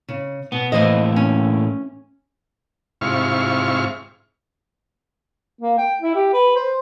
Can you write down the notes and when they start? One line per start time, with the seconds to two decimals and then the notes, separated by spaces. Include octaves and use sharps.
0.08 C#3
0.52 B2 B3
0.72 A2 E3 A#3 B4 C5 D#5
1.16 C#4
3.01 G#2 C3 E4 F4 C#6 F6
5.61 A#3
5.78 G5
6.02 E4
6.15 G4
6.33 B4
6.56 C5